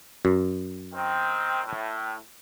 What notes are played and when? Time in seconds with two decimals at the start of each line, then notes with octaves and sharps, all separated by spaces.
0.25 F#2
0.93 D#3 C4
1.64 A2